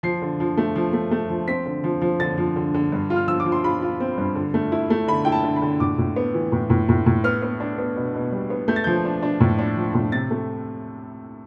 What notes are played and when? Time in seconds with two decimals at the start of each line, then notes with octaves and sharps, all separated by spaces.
0.03 F3 C7
0.22 D3
0.40 F3
0.57 A3
0.76 F3
0.93 A3
1.11 A3
1.29 F3
1.48 C4 B6
1.66 D3
1.84 F3
2.01 F3
2.20 D3 A6
2.38 F3
2.56 D3
2.74 D3
2.92 G2
3.10 F4
3.16 F6
3.28 F3 E6
3.40 D6
3.46 F3
3.52 C6
3.64 F4 B5
3.82 F4
4.00 C4
4.18 G2
4.35 D3
4.54 A3
4.72 E4
4.90 A3
5.08 D3 B5
5.25 E4 G5
5.32 A5
5.43 D3
5.56 B5
5.62 D3
5.80 A2 D6
5.98 A2
6.16 B3
6.34 E3
6.52 A2
6.70 A2
6.89 A2
7.06 A2
7.24 B3 F6
7.42 B3
7.60 D4
7.78 B3
7.96 B2
8.14 B2
8.32 G3
8.50 B3
8.68 A3 G6
8.76 A6
8.84 F3 G6
9.05 D4
9.22 D4
9.40 A2
9.59 D4
9.77 F3
9.94 A2
10.12 C3 A6
10.31 A3